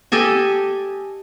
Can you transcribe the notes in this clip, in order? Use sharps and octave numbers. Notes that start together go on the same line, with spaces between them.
G4 A4 D#5 G#5